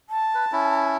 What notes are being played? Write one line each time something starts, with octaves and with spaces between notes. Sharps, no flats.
A5
B4
C#4 E4